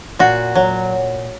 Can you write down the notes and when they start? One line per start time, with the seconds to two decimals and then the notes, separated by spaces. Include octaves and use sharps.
0.19 A#2 F#4
0.55 F#3